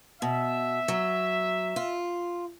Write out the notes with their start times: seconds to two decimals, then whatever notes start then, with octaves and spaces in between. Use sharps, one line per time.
0.22 B2 E5
0.88 F#3
1.76 F4